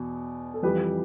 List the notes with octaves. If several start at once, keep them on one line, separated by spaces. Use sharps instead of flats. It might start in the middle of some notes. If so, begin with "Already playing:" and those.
Already playing: E2 B2
A4
F2 E3 G3 G4 B4
B4